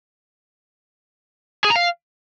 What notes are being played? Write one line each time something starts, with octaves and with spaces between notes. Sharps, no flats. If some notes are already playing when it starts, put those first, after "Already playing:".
G#4
A#5
F5